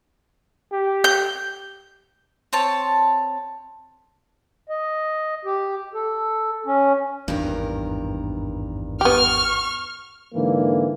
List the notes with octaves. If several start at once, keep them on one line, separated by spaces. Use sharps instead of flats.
G4
G6
C4 C#5 A5
D#5
G4
A4
C#4
G#1 E2 G2 D#3 A#4
B3 G4 C#6 F6
G#2 D3 E3 A#3